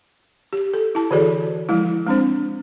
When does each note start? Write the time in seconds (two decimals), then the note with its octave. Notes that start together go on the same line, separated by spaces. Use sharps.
0.53 G4
0.74 A4
0.95 E4 A5
1.11 D3 E3 F#4 G#4 A4 D5
1.69 F3 G#3 E4
2.07 G#3 C4 D4 C5